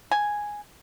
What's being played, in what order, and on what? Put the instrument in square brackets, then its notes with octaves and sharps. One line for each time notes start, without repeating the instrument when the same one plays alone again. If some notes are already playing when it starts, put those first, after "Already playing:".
[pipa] G#5